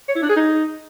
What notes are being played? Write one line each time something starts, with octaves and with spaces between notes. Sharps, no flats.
C#5
E4
D4
G#4
D#4